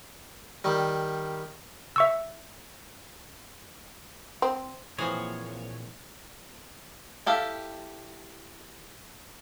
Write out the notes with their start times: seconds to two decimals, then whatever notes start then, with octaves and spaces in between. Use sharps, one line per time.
0.64 D#3 G3
1.96 E5 C#6 E6
4.42 C4
4.98 A#2 E3 F3 C4 F#4 G#4 C#5
7.26 E4 G4 A4 F5